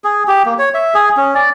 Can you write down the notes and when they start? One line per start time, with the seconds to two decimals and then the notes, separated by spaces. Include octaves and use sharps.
0.04 G#4
0.27 G4
0.45 A#3
0.59 C#5
0.74 E5
0.94 G#4
1.17 C#4
1.35 D5